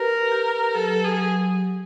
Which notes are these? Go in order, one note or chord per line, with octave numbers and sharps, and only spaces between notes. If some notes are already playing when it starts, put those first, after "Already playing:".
Already playing: G4 A#4 B4
G4
F#3 A4
G#4
F#3